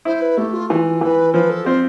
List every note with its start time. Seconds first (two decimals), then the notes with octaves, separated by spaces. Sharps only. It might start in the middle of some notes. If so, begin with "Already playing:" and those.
0.05 E4 C5
0.21 B4
0.37 A3 G4
0.53 F4
0.70 E3 F4 G4
1.01 E3 B4
1.34 F3 B4
1.50 A4
1.65 C4 F4